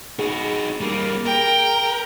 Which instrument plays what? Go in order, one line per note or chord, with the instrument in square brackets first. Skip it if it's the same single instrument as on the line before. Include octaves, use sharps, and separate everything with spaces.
[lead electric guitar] D#4 F#4 [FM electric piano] G#4
[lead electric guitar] G3 A#3
[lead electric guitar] A#4 [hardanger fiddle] G5